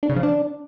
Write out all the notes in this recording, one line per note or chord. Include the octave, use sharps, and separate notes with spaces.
D4
C#3
F3
D4